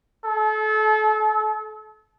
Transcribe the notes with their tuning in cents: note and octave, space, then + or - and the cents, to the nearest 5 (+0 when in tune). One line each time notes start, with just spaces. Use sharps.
A4 -35